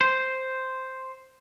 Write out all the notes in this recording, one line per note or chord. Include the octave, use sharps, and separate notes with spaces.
C5